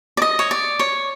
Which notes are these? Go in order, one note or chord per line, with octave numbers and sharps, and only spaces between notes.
D5
D#5
C#5
D5
C#5